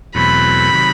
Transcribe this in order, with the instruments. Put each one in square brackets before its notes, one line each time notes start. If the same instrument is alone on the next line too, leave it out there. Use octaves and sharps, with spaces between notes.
[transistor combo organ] E2 B2 F#3 A3 C4 [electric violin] B5
[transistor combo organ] C3 D#3 F#3